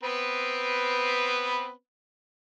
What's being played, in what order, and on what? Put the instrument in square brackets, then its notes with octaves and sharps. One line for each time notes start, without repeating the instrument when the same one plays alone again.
[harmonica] B3 C4 B4